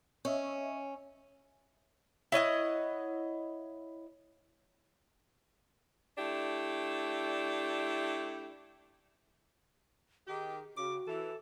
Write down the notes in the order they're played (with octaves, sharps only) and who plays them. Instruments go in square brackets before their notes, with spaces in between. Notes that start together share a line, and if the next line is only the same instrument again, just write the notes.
[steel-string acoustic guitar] C#4 [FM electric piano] C#5 D#5 E5
[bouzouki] E4 C#5 D#5 F#5
[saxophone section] A3 D4 E4 G4
[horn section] D#3 G4 [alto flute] G#4
[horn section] C#3 [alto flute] F#4 [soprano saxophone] D6
[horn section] E3 [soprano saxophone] A4